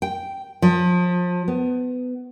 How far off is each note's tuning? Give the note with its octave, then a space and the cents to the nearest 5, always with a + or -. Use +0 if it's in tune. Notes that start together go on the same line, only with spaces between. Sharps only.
G5 -5
F3 +30
B3 +20